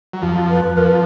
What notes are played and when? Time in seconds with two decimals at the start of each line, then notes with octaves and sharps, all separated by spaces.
0.13 F#3
0.22 F2 F3
0.50 B4
0.77 F2 F3 A#4